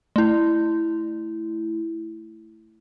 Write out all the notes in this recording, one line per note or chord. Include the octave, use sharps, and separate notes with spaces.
A3 E4